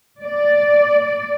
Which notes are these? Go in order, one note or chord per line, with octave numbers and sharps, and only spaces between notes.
D5